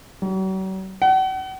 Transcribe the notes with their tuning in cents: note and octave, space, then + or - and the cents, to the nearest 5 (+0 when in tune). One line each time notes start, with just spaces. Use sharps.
F#3 +45
F#5 +40